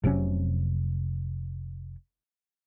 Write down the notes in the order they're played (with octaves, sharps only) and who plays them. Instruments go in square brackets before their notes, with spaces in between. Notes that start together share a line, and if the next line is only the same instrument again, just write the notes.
[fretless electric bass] F1 C3 F#3 C#4